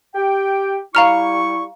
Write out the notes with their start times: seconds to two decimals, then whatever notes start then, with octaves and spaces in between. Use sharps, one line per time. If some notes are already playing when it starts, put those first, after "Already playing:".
0.15 G4 G5
0.95 G3 E4 F5 A#5 C#6 F6